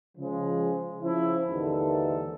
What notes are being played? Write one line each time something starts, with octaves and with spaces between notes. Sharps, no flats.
C#3 F3 G#3
C#3 F3 C#4 E4
D#2 G#2 D3 E3 A4